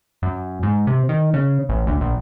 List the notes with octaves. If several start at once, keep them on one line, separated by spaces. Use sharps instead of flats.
F#2
G#2
C3
D#3
C#3
A1
D2
A#1